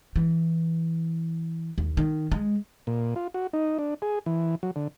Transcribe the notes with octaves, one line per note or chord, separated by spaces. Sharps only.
E3
D#2
D#3
G#3
A#2
F4
F#4
D#4
D4
G#4
E3
F#3
D3